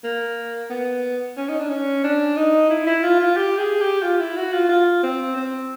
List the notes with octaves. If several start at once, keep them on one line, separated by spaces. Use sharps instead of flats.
A#3
B3
C#4
D#4
D4
C#4
D4
D#4
E4
E4
F4
F4
G4
G#4
G4
F4
E4
F#4
F4
F4
C4
C4